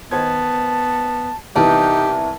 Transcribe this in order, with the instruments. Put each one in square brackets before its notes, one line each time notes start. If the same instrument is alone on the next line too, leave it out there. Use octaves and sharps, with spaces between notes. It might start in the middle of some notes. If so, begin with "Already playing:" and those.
[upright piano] D#3 C5 G#6 [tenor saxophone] B3 [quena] A5
[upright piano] C2 E3 B3 [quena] D#4 [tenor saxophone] G4 [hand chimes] E5 A5